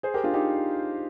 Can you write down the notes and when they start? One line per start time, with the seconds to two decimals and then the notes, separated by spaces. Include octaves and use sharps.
0.03 G#4 C5
0.14 G4 A#4
0.24 D4 F4
0.34 D#4 G4